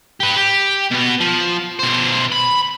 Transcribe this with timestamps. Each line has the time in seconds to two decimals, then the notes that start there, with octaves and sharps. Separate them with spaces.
0.20 G4 B4
0.37 G4
0.91 B2 B3
1.20 F3
1.79 B2 C5
2.32 B5